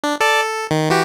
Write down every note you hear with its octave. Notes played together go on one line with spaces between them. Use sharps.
D4
A4 D5 A5
A4
D#3
E3 F#4 G4